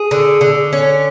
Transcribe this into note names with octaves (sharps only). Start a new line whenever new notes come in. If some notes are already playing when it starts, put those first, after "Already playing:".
Already playing: G#4
D3
D3
C#4